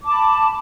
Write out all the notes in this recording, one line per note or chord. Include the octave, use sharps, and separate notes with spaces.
A5 B5 D6